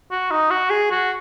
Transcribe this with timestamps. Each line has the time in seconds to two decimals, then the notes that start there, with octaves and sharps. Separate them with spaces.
0.11 F#4
0.31 D#4
0.50 F#4
0.70 G#4
0.91 F#4